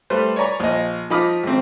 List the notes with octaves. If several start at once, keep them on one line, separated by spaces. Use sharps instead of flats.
G3 A3 B4 C5
C#5 D5 G#5 A#5 B5 C#6
A#1 D#5
F3 D#4 B5 D6 D#6 F6
G#1 C4